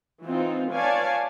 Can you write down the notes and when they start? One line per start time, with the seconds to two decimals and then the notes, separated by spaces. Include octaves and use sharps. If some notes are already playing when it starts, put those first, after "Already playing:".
0.24 E3 C4 D#4 F4
0.71 B4 C#5 D5 F5 G#5 A5